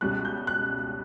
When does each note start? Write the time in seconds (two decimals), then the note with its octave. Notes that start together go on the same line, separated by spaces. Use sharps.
0.01 C#2 B2 G3 C#4 F#6
0.25 G6
0.47 F#6